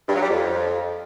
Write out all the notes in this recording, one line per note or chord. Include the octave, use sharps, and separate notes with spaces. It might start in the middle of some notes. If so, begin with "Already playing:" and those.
G2
F#3
G3
F2